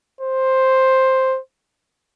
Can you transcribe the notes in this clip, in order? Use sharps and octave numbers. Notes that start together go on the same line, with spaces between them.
C5